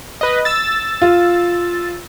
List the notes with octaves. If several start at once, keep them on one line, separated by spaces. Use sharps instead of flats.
B4 D#5
E6 A6
F4